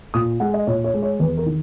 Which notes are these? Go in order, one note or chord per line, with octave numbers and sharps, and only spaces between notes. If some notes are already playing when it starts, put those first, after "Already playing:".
A#2 D#6
G#3 F#5
D#5
A#2 C#5
C#5
G#3
C#5
E2 B4
A#4
D#3